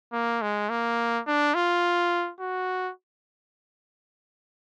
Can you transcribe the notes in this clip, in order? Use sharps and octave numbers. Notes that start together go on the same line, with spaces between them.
A#3
G#3
A#3
D4
F4
F#4